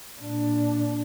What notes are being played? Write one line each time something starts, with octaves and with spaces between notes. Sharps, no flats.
A#2 D4